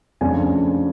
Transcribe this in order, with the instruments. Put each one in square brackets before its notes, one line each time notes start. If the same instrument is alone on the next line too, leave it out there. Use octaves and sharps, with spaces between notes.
[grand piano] F2 C#3 F3 A3 D4 G#5